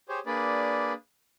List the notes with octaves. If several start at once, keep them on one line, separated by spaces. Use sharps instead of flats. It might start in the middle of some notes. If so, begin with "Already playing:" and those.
G4 G#4 C5 C#5
A#3 D4 G#4 B4 D5